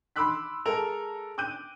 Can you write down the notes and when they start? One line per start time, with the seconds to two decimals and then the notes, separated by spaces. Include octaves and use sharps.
0.16 B5 C6 D6 E6 F#6 B6
0.66 G#3 A4 A#4 F7
1.38 D6 F#6 G6 D#7